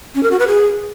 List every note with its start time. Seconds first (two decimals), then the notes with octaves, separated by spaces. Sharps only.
0.15 C#4
0.23 A#4
0.31 F#4
0.39 B4
0.48 G#4